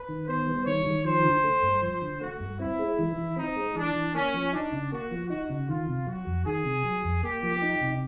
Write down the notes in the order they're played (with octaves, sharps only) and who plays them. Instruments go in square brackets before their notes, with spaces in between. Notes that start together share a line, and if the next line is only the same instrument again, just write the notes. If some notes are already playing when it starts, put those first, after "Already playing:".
Already playing: [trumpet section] B4
[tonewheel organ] D#3
[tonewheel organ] B3 [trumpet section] C5
[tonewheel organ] G3
[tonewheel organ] D#3 [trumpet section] C#5
[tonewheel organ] D#3
[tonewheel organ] F3 [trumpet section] C5
[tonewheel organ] D3
A3
G2
[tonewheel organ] F3 [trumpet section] C5
[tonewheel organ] D3
[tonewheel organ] A3 [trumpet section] F#4
[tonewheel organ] G2
[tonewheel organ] C4 [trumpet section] E4
[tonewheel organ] G#3
E3
E3
[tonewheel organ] C4 [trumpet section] D#4
[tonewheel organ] G#3
[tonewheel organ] E3 [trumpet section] D4
[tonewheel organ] E3
[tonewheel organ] A#3 [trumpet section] C#4
[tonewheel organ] F3
[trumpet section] D4 [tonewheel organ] D#4
[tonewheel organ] C#3
[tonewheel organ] A#3 [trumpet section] F#4
[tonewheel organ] F3
[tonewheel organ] D#4 [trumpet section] F#4
[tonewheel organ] C#3
[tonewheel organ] D#3 [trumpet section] F4
[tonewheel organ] C3
[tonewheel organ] F#3 [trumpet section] F#4
[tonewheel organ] F2
[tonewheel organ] D#3 [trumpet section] G#4
[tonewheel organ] C3
F#3
F2
[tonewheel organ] A#3 [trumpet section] G4
[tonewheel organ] F3
D#4
C3